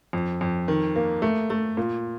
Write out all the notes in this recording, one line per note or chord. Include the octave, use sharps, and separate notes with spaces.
F2
F2
D#3
A#3
A3
A3
A#2